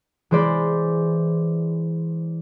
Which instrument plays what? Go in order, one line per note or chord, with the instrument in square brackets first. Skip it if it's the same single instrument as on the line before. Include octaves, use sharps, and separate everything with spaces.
[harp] E3 G#3 C5 D5 B5